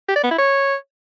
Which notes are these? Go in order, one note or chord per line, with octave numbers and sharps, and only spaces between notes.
G4
D5
B3
E4
C#5